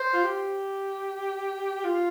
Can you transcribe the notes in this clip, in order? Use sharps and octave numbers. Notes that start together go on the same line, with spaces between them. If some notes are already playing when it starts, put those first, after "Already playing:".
Already playing: C5
F4
G4
F4